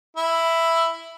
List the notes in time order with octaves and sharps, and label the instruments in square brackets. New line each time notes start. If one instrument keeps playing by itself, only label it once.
[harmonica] E4